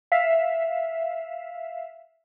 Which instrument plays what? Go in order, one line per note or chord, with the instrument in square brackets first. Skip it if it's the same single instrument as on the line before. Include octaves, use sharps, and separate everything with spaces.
[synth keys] E5 F5